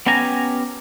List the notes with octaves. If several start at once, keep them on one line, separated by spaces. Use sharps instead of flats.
B3 C#4 G4 G#5 A#5